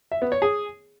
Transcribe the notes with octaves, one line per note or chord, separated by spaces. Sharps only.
E5
B3
C#5
G#4